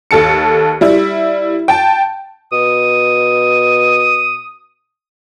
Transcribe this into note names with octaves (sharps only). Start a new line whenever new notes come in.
D#2 A4 A5 C#7
G3 E4
G5 A5
B2 D#6